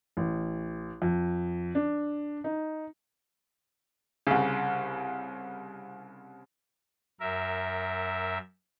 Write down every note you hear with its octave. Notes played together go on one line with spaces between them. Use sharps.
A1
F2
D4
D#4
C2 C#3
F#2 A#4 E5